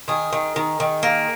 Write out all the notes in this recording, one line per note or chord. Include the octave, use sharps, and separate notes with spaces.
D#3 G#4
D#3
D#3
D#3
A#3